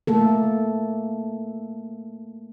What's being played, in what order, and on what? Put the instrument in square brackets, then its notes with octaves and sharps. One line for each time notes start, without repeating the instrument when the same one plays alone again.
[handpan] A3 A#3 A4